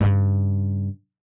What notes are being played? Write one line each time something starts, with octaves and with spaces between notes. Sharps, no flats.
G2 C#3